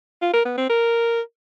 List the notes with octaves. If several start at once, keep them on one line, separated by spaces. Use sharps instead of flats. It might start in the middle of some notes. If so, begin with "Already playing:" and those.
F4
A#4
B3
C4
A#4